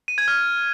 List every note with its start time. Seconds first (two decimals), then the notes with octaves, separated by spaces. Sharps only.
0.08 D#7
0.18 G#6
0.28 F6